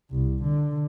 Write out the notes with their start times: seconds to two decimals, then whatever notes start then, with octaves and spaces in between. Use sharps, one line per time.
0.11 C2
0.43 D3